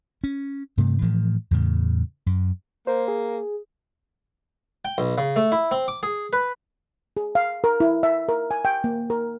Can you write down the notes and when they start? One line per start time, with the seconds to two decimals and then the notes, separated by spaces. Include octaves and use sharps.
0.24 C#4
0.77 G2 C3 A3
1.02 A2 E3 F3 A3
1.51 E2 A2 C#3
2.26 F#2
2.87 A#3 C5
3.08 G#4
4.85 G5
4.98 B1
5.18 C#3
5.36 A3
5.52 E4
5.71 C4
5.88 D6
6.03 G#4
6.33 B4
7.17 G#4
7.35 F5
7.64 A#4
7.80 E4
8.03 E5
8.29 A#4
8.51 G#5
8.65 G5
8.84 A#3
9.10 A#4